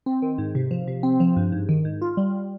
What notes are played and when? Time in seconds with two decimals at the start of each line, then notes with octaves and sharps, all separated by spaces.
0.06 C4
0.22 D#3
0.38 G#2
0.55 C3
0.71 F3
0.88 C3
1.03 C4
1.20 F3
1.37 G2
1.52 G#2
1.69 D#3
1.85 G#2
2.02 F4
2.17 G3